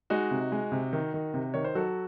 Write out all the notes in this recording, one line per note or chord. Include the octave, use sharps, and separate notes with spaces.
G#3 D#4 F#4
C3
G#3
C3
D#3
D#3
C3
D#3 C#5
C5
F#3 F#4 A4